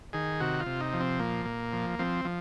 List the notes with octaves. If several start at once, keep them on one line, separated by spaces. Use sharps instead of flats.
D#3 G#4
C3 F#4
F4
C3
D#4
F3
C4
A#2 A#3
A#2
F3
F3 C4
F3